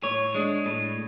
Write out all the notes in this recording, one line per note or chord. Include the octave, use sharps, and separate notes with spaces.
A2 C#5
G#3 D4
A2